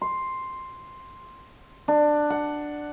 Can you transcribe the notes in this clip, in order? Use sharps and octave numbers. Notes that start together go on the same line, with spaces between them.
C6
D4
F#5